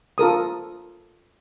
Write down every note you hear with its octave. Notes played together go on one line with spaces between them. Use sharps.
F4 A4 A#4 D#6